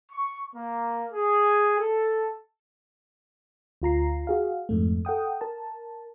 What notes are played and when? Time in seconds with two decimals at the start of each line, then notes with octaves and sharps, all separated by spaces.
0.12 C#6
0.55 A#3
1.12 G#4
1.79 A4
3.82 D2 F4 A#5 C7
4.27 F#4 G#4 F5
4.69 F2 G#2 A3
5.05 A4 F#5 G5 D#6
5.41 A#4 A5